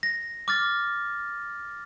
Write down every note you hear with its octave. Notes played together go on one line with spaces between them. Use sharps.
A#6
D6 F6 A6